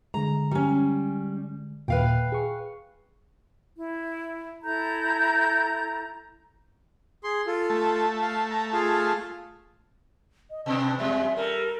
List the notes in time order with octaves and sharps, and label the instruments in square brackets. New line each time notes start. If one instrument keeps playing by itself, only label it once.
[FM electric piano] D3 G#3 [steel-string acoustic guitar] A#5
[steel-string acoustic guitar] G3 C#4
[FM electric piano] D#2 A#2 [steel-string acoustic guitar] B4 F5 G5
[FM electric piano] G#4 C#6
[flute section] E4
E4 A4 A#5 G6
[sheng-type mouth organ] G#4 C6
F4 A4
[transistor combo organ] A3
[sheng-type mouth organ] F5
A#5
F4 G#4 F5
[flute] D#5
[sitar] B2 B3 D4 [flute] A5
[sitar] E2 G3 G#3 [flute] E5
[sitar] G3 F4 A4 [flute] A#4